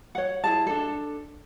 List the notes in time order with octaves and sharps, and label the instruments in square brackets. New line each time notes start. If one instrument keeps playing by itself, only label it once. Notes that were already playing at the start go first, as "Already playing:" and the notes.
[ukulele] C#5 F#5
E4 G#4 A5
D4 A4